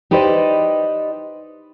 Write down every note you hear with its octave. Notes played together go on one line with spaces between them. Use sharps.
D#4 G4 B4 C5 D5 D#5